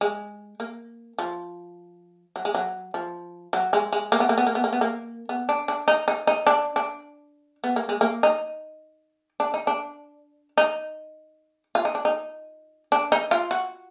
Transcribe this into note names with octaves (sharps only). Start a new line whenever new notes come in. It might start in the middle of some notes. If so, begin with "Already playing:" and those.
G#3
A#3
F3
F#3
G#3
F#3
F3
F#3
G#3
G#3
A#3
B3
A#3
B3
A#3
B3
A#3
B3
A#3
B3
D4
D4
D#4
D#4
D#4
D4
D4
B3
A#3
G#3
A#3
D#4
D4
D#4
D4
D#4
F4
D#4
D4
D#4
D4
D#4
F4
F#4